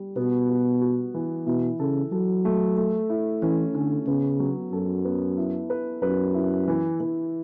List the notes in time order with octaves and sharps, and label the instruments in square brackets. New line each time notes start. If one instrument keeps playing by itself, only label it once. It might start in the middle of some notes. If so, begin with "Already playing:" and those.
Already playing: [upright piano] G3
[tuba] B2 [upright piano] B3
[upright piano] F#4
F#4
E3
[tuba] B2 [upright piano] E4
[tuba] C#3 [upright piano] A4
[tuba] F#3 [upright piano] A4
[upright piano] A3
A3
E4
[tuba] E3 [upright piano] C#4
[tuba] D3 [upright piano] C#4
[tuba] C#3 [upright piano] B3
[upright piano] F#3
[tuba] F#2 [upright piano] A4
[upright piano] B3
E4
B4
[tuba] F#2 [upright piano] B4
[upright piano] E4
E3
E3